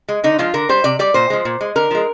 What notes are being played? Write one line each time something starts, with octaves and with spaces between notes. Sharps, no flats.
G#3
D3 D#4
F3 G#3 F4
D3 A#4
G3 C5
C3 D5
G3 D5
A#2 C5
F3 G#3
A#2
G#3
D3 A#4
F3 G#3